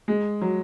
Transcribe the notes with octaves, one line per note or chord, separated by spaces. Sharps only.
G#3
F#3